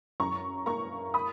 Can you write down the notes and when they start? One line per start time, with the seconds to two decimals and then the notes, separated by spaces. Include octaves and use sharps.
0.20 F#2 A#5 C#6
0.66 A#3 A#5 C#6
1.14 B5 D#6